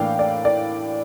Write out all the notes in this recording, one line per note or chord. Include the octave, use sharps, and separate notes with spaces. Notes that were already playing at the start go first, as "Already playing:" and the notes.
Already playing: A2 E3 A#3 D4 F5 G5
D5
D5